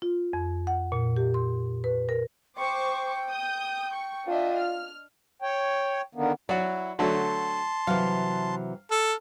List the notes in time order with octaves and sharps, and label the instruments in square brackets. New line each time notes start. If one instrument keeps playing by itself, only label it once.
[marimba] F4
F2
F#5
A#2
G4
C6
B4
A#4
[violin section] C5 C#6 D6 [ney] G5
[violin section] D#6 G6
C#6
[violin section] D4 D#5 E5 [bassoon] F4
[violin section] F6
[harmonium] C#5 G5
D3 D#3 A#3 B3
[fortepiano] F#3 F#4 [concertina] E4 [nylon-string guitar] D5
[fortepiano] D3 F#3 A3 [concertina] A5 C6
[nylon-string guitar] C3 E3 F#3 [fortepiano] F5
[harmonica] A4 [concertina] F6